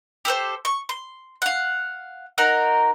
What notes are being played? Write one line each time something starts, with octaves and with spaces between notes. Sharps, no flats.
G4 A4 B4 C5
C#6
C6
F5 F#5
D#4 F#4 A#4